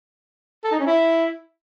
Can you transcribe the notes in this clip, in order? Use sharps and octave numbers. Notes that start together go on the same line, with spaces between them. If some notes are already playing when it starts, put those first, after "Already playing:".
A4
D#4
C#4
E4